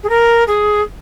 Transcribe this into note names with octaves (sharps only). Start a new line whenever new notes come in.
G#4
A#4
G#4